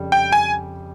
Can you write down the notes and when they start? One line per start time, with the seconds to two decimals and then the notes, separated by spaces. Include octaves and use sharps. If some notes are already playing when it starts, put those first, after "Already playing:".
Already playing: F2 C#3 G3
0.12 G5
0.32 G#5